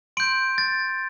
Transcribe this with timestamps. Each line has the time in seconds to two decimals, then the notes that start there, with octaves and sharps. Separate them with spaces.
0.17 C6 G6 D7
0.58 A6